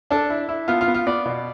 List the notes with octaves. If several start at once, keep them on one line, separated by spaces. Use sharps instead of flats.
D4 A4
E4
E4
B3 F4
F4
B3
F4
B3 D5
B2